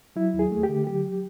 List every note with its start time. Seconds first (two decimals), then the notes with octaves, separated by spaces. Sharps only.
0.16 F#3 E4
0.34 D#2
0.39 G#4
0.51 A3
0.63 G4
0.69 D3
0.87 F#3 G4